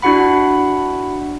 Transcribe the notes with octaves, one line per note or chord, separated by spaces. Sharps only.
D4 E4 F#4 F#5 B5